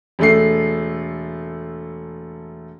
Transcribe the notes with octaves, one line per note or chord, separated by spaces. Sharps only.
E1 A3 C7